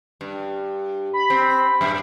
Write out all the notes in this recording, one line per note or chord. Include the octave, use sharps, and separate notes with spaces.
G2
B5
C4
F#2 A2